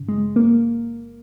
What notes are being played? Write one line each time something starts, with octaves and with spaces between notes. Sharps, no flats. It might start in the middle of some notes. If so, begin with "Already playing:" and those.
Already playing: G1 C#3
G#3
A#3